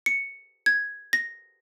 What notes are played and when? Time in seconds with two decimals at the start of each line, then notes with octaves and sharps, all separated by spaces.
0.06 C#7
0.66 G#6
1.13 A#6